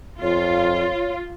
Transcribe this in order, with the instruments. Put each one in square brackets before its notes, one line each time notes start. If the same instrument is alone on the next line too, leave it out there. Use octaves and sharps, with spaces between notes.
[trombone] F2 [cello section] F4 [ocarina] C#5